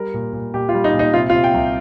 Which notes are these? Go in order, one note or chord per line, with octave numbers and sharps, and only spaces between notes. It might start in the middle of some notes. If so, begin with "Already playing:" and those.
Already playing: G3 A#4
A#2
A#2
A#2 G4
F4
G3
D#4
A#2
D#4
C3 F4
F4
C3
G5
C2